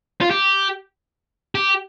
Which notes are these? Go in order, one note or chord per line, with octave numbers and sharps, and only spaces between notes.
F4
G4
G4